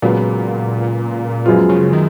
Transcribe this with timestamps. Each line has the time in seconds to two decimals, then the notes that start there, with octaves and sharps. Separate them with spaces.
0.02 C#2 A#2 C#3 F#3 B3
1.46 F#2 F3 G#3 B3 F4
1.69 C#3
1.93 D#3